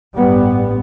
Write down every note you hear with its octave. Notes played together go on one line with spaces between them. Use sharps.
A1 G2 G3 B3